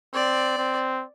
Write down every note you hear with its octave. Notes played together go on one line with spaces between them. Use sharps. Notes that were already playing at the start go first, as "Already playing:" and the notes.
C4 D5
C4